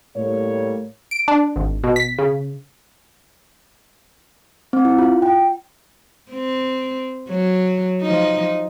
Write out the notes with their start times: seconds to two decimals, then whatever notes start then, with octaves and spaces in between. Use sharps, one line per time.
0.16 A2 G3 A#3 C#5
1.11 D7
1.28 D4
1.56 G#1
1.84 B2
1.96 B6
2.19 C#3
4.73 C4
4.85 E4
4.98 F4
5.22 G5
6.31 C4
7.28 F#3
8.02 F3 D#4